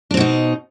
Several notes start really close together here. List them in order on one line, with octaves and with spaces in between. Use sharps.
D4 C4 B2 D#4